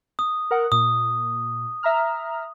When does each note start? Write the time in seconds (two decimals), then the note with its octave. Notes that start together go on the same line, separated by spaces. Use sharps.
0.19 D#6
0.51 A#4 F#5
0.72 A#2 D#6
1.83 E5 A#5 F6